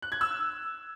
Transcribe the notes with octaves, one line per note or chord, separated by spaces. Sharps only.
F#6
G#6
E6